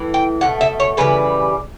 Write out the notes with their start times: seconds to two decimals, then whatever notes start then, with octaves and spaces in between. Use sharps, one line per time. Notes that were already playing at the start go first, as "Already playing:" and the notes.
Already playing: A2 E3
0.14 G5
0.41 B2 A3 F#5
0.61 E5
0.80 C#5
0.97 C#3 E3 G3 B4